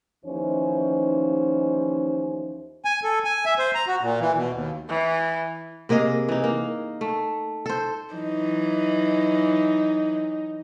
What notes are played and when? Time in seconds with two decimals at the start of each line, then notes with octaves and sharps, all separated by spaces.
0.25 D#2 E3 F3 C#4 D#4 C5
2.85 G#5
3.04 A4
3.25 G#5
3.46 E5
3.59 C5
3.75 A#5
3.87 F#4
4.01 A#2
4.21 E3
4.35 B2
4.53 D#2
4.89 E3
5.89 C3 A#3 G#4 D#5
6.29 E3 D#4
6.44 A#3
7.01 A3
7.66 A4 C5
8.14 E3 F#3 D#4